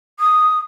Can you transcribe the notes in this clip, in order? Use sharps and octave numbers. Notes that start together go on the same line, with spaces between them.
D#6